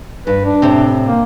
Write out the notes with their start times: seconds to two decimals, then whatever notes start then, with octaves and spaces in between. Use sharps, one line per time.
0.27 G2 B4
0.45 D4
0.62 A2 C3
1.06 A#3